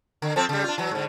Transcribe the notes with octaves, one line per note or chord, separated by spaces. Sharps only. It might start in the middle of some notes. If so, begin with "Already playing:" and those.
D3
F3 C4 A4
C#3 G3
D4 F4
E3 F#3
G#2 D3